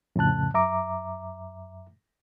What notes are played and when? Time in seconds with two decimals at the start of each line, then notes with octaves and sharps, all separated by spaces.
0.16 F2 A2 C#3 A5 F#6
0.54 F#2 E5 A#5 D6